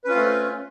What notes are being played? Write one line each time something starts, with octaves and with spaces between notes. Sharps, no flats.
A3 C4 C#4 F4 B4